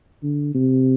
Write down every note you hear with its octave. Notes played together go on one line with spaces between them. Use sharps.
D3
C3